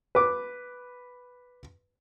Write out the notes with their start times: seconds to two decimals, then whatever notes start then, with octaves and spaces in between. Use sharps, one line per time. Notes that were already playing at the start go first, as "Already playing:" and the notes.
0.15 B4 D6